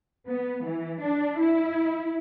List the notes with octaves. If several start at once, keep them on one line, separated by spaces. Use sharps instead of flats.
B3
E3
D4
E4